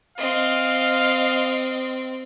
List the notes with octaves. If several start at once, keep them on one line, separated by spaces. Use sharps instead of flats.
C4 D#5 F5